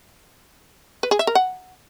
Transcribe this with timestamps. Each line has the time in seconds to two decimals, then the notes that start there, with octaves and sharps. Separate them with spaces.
1.03 B4
1.11 G#4
1.19 E5
1.27 A#4
1.35 F#5